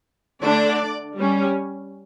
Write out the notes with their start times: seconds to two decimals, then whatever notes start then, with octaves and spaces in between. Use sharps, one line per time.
0.43 D3 A3 D4 D5
1.18 G3 C#4